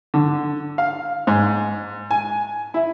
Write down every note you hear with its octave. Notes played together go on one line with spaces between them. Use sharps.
D3
F5
G#2
G#5
E4